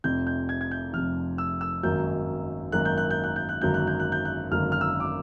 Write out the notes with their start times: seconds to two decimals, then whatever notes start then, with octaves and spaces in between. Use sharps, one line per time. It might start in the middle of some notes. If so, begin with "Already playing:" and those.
0.04 F1 F2 C3 G6
0.27 G6
0.49 G#6
0.61 G#6
0.71 G6
0.93 F1 F2 C3 F6
1.38 E6
1.61 E6
1.83 G#1 F#2 D#3 F#3 A#3 G6
2.72 G#1 F#2 D#3 F#3 A#3 F#6
2.85 G6
2.98 F#6
3.11 G6
3.24 F#6
3.36 G6
3.49 F#6
3.62 G#1 F#2 D3 F#3 A#3 G6
3.74 F#6
3.87 G6
4.00 F#6
4.12 G6
4.25 F#6
4.51 G#1 F#2 D3 F#3 A#3 F6
4.72 F6
4.81 E6
5.00 D6